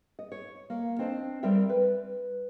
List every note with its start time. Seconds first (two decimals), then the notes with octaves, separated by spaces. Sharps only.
0.19 D#5
0.32 C#5
0.70 A#3
0.99 C4 D4 C5 D#5
1.43 G3 C4 A#4 E5 G5
1.69 B4